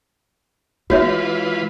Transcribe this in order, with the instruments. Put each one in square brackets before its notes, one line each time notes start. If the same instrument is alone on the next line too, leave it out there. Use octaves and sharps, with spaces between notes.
[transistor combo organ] E3 F4 B4 [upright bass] G#3 [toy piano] F#4 C#5 E5